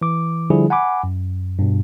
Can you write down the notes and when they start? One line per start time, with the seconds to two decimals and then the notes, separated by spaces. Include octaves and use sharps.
0.01 E3 D6
0.50 D3 F3 G3 E4 G#4
0.70 F#5 G#5 B5 D6
1.03 F#2
1.59 G2 B2